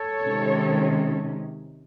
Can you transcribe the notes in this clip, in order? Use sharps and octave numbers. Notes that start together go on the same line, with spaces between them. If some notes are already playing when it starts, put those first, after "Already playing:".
Already playing: A4 C#5
C3 D#3 G#3 C#4